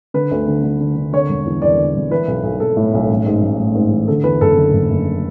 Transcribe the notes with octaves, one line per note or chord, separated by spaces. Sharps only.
D3 B4
D2
D3
D3
D3
D3
D3 C#5
E1
E2
E2 D5
D3
E1
E3 B4
B1
B1
B1 A4
A2
B1
A1
G#2
A1
A1
G#2
E3
D3 A4
E2 B4
F#1 A4
D3
F#1
F#1